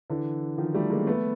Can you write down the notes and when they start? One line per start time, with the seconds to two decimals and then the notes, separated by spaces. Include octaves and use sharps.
0.10 D3 E3
0.58 D#3 F3
0.74 G3 A3
0.90 G#3 A#3
1.07 A3 B3